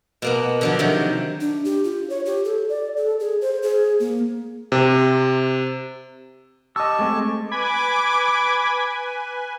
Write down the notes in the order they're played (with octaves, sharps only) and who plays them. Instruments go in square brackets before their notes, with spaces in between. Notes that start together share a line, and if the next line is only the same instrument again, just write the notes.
[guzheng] B2 A#3 B3
D3 F3 F#3
C3 D#3 F#3
[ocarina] D4
G4
F4
C#5
G4
A4
D5
A4
G#4
C5
G#4
A#3
[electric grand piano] C3
[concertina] G4 A5 C#6 [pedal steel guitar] D#5 E6
[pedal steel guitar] G#3 A3 C4
[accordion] B4 G#5 [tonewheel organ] B5 G#6 [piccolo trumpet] D6